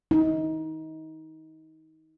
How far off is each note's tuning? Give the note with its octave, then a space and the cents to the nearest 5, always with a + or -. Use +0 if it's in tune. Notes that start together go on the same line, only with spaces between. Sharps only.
D#4 +25